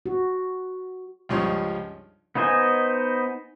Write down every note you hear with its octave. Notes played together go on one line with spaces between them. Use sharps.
F#4
C#2 G2 F3 D#4 C#5
B3 D#4 C5 D#5 G#5